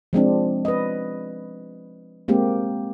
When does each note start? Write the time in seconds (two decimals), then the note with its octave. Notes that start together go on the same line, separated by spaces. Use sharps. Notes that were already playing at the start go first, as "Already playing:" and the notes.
0.13 F3 G#3 C4 D4
0.65 B4 D#5
2.28 G#3 A#3 C4 G4